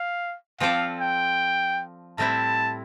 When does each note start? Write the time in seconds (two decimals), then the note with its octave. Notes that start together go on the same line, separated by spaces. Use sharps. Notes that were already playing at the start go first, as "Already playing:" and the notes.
Already playing: F5
0.60 F3 C4 F4 A4 D5 F5
1.00 G5
2.18 A2 G3 C4 E4 A5